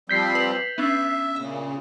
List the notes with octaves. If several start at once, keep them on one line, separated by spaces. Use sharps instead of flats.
F3 G3 C4 G6 B6 C7
B4
B3 C#4 D4 E5
A#2 C#3 E5